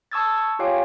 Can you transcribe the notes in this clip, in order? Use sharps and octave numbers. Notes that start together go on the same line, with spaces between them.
A5 C#6 D#6 E6 G#6 A6
C#6
F4 G4 C#5 F5 G5 G#5